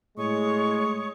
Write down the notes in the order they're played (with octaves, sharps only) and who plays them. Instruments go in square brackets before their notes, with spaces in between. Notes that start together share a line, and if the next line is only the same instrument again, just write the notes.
[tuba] A2 [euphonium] G#3 [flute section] C#5 C#6 D#6